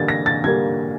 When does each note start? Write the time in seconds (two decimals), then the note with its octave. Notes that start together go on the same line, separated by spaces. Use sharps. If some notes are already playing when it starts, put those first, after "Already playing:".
Already playing: D3 G3 A#3 A6
0.08 A#6
0.26 A6
0.44 D3 G3 A#3 G#6